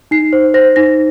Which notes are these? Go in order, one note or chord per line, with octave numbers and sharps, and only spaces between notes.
D#4 C7
C5
C5 A#6
D#4 A#6